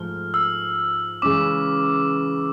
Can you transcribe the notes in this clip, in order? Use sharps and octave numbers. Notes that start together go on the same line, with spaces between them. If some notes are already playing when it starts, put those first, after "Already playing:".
Already playing: G#2 F3 A3 F6
E6
C#3 E3 G#3 C#4 D6